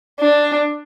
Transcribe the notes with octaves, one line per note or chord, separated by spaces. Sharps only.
D4